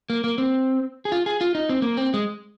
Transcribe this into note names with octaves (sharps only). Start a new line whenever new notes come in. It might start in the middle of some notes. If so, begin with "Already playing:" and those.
A#3
A#3
C4
G#4
F4
G#4
F4
D#4
C4
A#3
C4
G#3